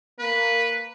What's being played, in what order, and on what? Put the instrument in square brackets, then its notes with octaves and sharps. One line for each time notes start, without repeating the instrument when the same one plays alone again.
[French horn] A#3 [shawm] B4